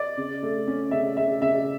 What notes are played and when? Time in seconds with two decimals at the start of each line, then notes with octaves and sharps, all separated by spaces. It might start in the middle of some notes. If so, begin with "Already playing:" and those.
Already playing: D5
0.17 C#3
0.43 A3
0.68 C#4
0.91 C#3 E5
1.17 C#3 E5
1.41 C#3 E5